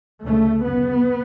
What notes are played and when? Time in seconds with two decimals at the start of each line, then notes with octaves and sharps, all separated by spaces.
0.23 D2 C#3 A3
0.64 F#2 C#3 B3